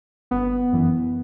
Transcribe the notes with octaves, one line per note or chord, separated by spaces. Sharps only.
G1 B3
F#2 E3